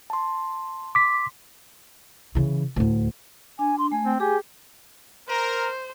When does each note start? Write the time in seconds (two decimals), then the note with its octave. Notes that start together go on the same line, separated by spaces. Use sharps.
0.10 A5 C6
0.95 C6 D6 B6
2.35 C#3 E3
2.76 D2 A2
3.59 D4 G#5
3.78 C6
3.92 A3 G#5
4.06 C4
4.20 G4 G#4 G#5
5.28 A#4 C5